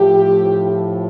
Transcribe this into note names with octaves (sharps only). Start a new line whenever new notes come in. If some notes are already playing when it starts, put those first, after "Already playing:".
Already playing: A2 F3 G4